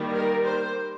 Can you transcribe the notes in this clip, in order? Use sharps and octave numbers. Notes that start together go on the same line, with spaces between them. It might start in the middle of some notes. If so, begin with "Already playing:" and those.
Already playing: D#3 G3 A#3
A#4
C5